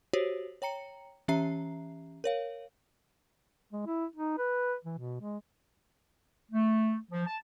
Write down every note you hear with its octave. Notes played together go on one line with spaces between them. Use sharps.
F#4 G4 C5 C#5
C#5 G5 A#5 C#7
E3 C#4 G4 E5 A#5 C7
A#4 C#5 F5
G#3
E4
D#4
B4
E3
B2
G#3
A3
F3
A5